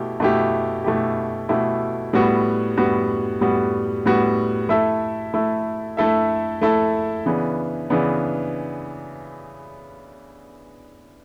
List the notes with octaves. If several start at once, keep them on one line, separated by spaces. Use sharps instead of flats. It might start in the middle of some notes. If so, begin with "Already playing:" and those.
Already playing: B2 A3 E4 G4
B2 A3 E4 G4
B2 A3 E4 G4
B2 A3 E4 G4
A2 G3 B3 F#4
A2 G3 B3 F#4
A2 G3 B3 F#4
A2 G3 B3 F#4
A3 E4 A4 E5
A3 E4 A4 E5
A3 E4 A4 E5
A3 E4 A4 E5
C#3 E3 B3 D4
C#3 E3 B3 D4